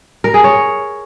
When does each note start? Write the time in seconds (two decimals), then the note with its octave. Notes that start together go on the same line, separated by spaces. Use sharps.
0.24 A#4
0.34 G#4
0.44 C#5